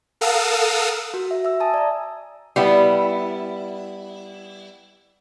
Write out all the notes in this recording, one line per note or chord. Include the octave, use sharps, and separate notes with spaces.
A4 A#4 F5 F#5 D#6 E6
F#4
E5
E5 E6
G#5 A5 D#6
D5 A#5
G3 B3 E4